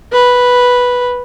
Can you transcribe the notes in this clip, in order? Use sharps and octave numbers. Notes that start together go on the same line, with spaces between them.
B4